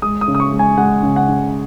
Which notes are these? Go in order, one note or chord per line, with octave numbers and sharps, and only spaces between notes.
G#3 D#6
D#6
C#3
D#6
C#6
G#3
G#5
G#3 F#5
C#3
F#5
C#3